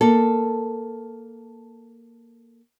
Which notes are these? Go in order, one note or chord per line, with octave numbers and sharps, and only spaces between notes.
A#3 A4